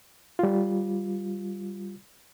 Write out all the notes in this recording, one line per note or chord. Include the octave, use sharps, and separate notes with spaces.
G3 F4